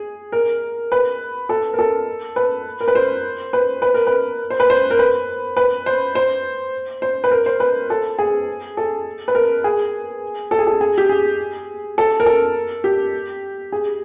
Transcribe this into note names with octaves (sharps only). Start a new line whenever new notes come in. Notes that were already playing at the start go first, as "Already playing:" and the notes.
Already playing: G#4
A#4
B4
A4
A#4
A4
B4
A#4
B4
C5
B4
B4
A#4
B4
C5
B4
C5
A#4
B4
B4
C5
C5
C5
B4
A#4
C5
B4
A4
G#4
A4
B4
A#4
G#4
A4
G#4
A4
G#4
G4
G#4
A4
A#4
A4
G4
G#4